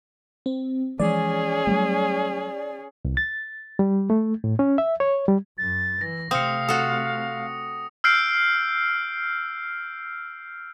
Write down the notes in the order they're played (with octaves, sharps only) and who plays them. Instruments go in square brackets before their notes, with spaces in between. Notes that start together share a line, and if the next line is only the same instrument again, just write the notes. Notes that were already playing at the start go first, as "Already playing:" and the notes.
[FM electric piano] C4
[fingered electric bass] E3 F3 G#3 [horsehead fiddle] C#4 G#4 [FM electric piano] D5
[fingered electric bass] F#3 G3 A3
[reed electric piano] C2
A6
G3
A3
A2
C#4
E5
C#5
G3
[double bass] F#2 [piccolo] A6
[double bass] E3 [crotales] A#6
[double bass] C3 A3 [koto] C4 [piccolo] F5 [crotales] D#6 C#7
[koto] F#4 A4 [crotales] D#6
[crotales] E6 F6 G6 C7 D7